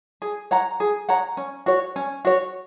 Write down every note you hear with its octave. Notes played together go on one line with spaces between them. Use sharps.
G#4
C#5 F#5 A#5
G#4
C#5 F#5 A#5
C#4
F#4 C#5
C#4
F#4 C#5